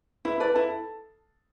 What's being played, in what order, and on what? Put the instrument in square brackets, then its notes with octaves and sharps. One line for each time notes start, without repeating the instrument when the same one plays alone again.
[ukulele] E4 [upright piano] B4 B5
[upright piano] A4 A5 [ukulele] B4 D5
[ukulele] E4 [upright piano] A4 A5